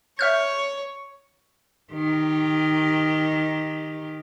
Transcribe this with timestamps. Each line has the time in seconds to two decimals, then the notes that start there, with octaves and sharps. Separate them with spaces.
0.19 C#5 E5 F6 G6
1.93 D#3 G4